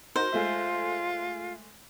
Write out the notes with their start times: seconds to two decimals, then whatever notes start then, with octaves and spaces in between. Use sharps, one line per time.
0.16 D#4 F#4 A#4 C5
0.32 G#3 A3 F4 E5